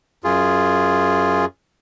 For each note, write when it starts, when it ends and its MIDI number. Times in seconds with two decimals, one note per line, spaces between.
0.24 1.45 42
0.24 1.45 65
0.24 1.45 68